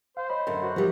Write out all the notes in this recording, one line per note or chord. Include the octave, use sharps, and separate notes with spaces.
C5 F5
C#5 D#5 B5
F#2 D3
F#4
D#3 F3 G3